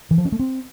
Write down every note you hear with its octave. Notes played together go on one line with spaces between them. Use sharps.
E3
F3
C#4
A3
C4